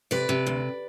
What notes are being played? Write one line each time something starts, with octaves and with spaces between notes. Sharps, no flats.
C3 B4 D5
C3
D2